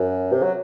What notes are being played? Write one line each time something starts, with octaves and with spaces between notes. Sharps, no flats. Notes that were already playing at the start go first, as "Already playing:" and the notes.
Already playing: F#2
C3
F#3